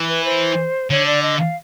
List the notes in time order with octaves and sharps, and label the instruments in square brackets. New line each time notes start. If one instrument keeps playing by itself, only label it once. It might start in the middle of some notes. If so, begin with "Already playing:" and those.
Already playing: [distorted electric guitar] E3
[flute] B4
C5
[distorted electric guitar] D3 [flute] C#5
[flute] D5
D#5
F5